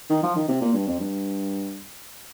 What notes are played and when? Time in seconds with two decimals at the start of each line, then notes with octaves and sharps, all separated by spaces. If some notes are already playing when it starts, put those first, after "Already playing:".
0.10 D#3
0.23 F3
0.36 D#3
0.48 C3
0.61 A#2
0.74 G2
0.87 F2
1.00 G2